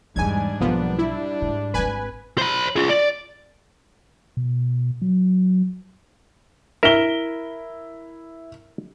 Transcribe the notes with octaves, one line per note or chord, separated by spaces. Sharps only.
E2 G#2 E3 G3 D4 G#5 G#6
B1 F3 G3 A#3 B3
E4
G#2
G#1 C4 B4 G#5
C5 B5
F4 G#4
D5
B2
F#3
E4 A#4 E5 G7